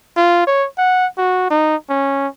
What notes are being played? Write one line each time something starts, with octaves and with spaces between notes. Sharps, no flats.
F4
C#5
F#5
F#4
D#4
C#4